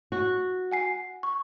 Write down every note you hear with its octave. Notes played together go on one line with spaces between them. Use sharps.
F#4
F#5 G#5 C7
C#6